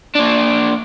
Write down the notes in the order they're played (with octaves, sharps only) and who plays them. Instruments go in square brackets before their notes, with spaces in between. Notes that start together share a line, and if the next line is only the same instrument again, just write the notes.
[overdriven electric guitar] A#2 D4